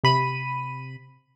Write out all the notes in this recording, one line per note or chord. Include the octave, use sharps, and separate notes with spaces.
C3 B5 D#7